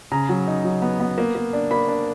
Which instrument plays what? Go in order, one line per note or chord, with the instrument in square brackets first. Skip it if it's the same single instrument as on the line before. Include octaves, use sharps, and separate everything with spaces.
[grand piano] C#3 A#5
F#3
D#4
F#3
B3
B3
A#3
A#3
D4
A#3 B5
D4